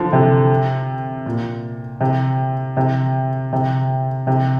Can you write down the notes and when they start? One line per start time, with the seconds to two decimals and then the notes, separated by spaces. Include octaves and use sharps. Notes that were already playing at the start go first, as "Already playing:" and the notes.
Already playing: D3 F3
0.13 C3
1.26 A#2
2.01 C3
2.77 C3
3.53 C3
4.27 C3